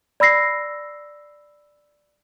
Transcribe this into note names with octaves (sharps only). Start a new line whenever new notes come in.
D5 B5 E6 A#6 C7